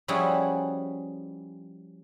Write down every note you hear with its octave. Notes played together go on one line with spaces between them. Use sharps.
F3 G3 C#4 E4 F#4 G#4